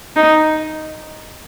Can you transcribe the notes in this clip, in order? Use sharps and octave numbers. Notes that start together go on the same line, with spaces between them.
D#4